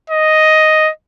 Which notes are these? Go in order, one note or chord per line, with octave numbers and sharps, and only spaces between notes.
D#5